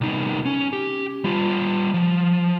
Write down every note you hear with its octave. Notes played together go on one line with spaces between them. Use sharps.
C2 D#4
C#4
G4
G3 F4
F3